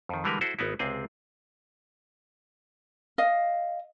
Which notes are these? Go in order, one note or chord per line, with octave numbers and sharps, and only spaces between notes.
F2 D#3
D3 E3 G3 G#3 A#4 B4
E4 F#4 A4 C5
G#1 B3 D#4 E4
C#2 C3 C4 G#4
D#5 F5